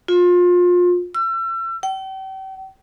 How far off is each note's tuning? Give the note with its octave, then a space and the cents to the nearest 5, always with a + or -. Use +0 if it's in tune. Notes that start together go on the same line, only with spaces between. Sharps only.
F4 +30
E6 +35
G5 -40